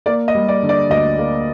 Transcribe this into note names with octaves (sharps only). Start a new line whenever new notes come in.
A#3 D5
D#5
G3
D5
D3
D5
D2 D#5
A#3